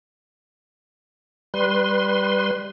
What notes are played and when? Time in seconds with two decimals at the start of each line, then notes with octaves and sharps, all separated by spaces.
1.54 G3 B4 C6